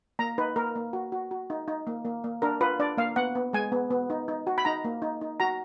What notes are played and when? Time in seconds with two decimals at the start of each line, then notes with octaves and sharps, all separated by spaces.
0.19 A#3 A#5
0.38 D#4 B4
0.56 A#3 A#4
0.75 A#3
0.93 F#4
1.12 F#4
1.31 F#4
1.50 D#4
1.68 D#4
1.87 A#3
2.05 A#3
2.24 A#3
2.42 D4 A#4
2.61 F4 B4
2.80 D4 D5
2.98 A#3 F5
3.16 B3 F#5
3.35 B3
3.53 G#3 G#5
3.72 B3
3.91 B3
4.10 D#4
4.28 D#4
4.47 F#4
4.58 B5
4.65 D#4 A#5
4.85 A#3
5.02 D#4
5.21 D#4
5.40 F#4 A#5